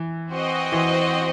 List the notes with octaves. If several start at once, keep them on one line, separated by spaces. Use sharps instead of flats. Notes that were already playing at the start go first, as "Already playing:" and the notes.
Already playing: E3
C4 F#4 C5 D#5
E3